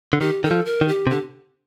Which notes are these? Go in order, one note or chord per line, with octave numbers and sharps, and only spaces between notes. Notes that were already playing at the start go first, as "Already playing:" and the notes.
D3
D#3 G4
D#3 A4
F3
A#4
D#3
G4
C3
D3 G4